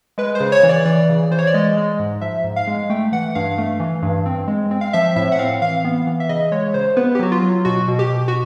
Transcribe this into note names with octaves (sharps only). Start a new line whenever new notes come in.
G#3 B4
C5
C#3
C#5
E3
D5
E3 D5
C#3
E3 C5
C#5
D5
G#3 D#5
G#3
G#2
F3 E5
G#2
F5
G#3
A3 G5
E3 F#5
G2 F5
A3
E3
G2
C4
G#3
C4
F5
F3 E5
A2 E5
F#5
C4 F5
E3 F5
B3
E3
E5
C#3 D#5
G#3 C#5
C#3 C5
B3 B4
G4
F#3 F#4
F4
F#3
B2 F#4
B2
G4
B2
F#4